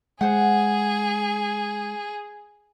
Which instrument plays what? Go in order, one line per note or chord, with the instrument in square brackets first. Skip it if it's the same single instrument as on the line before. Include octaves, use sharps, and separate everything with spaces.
[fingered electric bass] G#3 [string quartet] G#4 [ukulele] C5 F#5